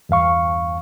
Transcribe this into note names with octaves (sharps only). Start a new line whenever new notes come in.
E2 G2 F5 C#6